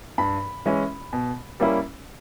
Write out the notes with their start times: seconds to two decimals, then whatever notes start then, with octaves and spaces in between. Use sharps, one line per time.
0.18 G2 B5
0.66 E3 G#3 C#4 E4
1.13 B2
1.60 G3 A#3 C#4 E4